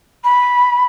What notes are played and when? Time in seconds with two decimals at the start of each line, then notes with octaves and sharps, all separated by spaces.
0.23 B5